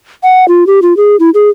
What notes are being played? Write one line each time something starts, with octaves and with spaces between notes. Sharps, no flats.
F#5
F4
G4
F4
G#4
E4
G#4